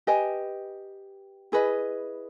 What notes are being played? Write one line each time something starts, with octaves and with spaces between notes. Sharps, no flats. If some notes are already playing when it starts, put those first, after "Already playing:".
G4 B4 D#5 G#5
E4 G#4 B4 D#5